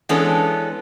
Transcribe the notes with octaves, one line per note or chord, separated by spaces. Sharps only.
E3 G#3 B3 C#4 D4 A4